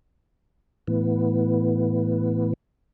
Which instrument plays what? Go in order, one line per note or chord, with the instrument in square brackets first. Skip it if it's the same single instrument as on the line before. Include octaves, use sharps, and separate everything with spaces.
[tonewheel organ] A2 E3 B3